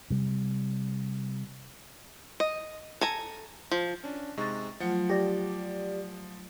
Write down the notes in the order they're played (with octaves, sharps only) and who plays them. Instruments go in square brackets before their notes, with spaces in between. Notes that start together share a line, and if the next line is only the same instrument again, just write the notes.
[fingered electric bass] C3 G3
[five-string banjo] D#5
A4 G#5 A#5
F3
[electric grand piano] C#4 D4
[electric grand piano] C3 G#3 D#4 [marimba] C#6 A6
[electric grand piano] F3 F#5 C#7 [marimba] F#3 A3 F4
[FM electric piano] G4 D5 [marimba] A#6